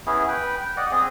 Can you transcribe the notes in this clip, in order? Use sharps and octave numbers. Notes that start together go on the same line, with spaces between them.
B3 C#4 E4 G#4
B4 G5
G5
D5 D#5 F#5
C4 G#4 D#5